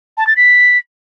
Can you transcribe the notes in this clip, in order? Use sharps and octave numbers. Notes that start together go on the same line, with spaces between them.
A5
A6
B6